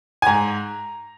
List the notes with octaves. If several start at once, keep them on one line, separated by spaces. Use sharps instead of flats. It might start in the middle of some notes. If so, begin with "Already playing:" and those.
G#5
G#2 A#5